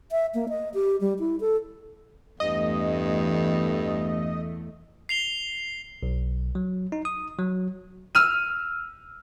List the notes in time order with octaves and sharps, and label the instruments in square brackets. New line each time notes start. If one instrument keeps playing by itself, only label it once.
[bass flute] E5
A#3
D#5
G4
G3
E4
A4
[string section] E2 A3 [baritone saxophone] G2 [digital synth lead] D#5
[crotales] C7 F7 G7
[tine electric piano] B1
F#3
D#4
D#6
F#3
[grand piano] E6 F6 D#7